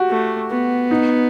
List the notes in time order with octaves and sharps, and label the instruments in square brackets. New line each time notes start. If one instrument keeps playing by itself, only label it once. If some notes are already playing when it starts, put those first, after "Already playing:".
Already playing: [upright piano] F#4 G4
[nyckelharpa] A3
B3
[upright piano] D#4